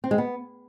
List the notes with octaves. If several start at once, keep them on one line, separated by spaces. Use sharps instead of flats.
C4
G#3
B3